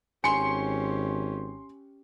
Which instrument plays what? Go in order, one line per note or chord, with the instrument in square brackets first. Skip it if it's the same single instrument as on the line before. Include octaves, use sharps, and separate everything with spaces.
[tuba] G#1 [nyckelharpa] C#4 G4 [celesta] G#5 [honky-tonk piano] C6 C#7